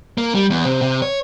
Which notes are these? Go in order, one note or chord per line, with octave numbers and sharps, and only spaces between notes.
A#3
G3
E2
C3
C3
C#5